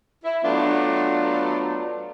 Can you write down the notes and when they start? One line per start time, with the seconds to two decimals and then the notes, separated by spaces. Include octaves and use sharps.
0.23 E4
0.43 F#3 A3 B3 D4 F4